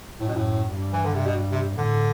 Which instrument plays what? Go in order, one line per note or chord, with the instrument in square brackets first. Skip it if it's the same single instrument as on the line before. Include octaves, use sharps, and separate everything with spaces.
[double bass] F#2 [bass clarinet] A2
[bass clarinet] B2
A2
[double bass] G2
[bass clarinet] E3
D3
C3
B2
C3
[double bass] A2 [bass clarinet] D3